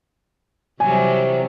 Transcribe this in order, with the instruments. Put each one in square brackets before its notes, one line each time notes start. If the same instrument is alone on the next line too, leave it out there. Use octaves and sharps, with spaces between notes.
[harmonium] C3 [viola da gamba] E3 F#3 G3 [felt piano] G#5